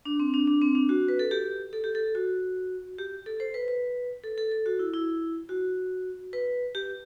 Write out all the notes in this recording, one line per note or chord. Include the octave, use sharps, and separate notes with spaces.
D4
C4
D4
D4
C4
D4
F#4
B4
A4
G4
A4
G4
A4
F#4
G4
A4
C5
B4
B4
A4
A4
A4
F#4
E4
E4
F#4
B4
G4